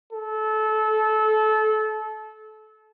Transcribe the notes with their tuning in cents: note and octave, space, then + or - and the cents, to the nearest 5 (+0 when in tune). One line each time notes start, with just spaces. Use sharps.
A4 -25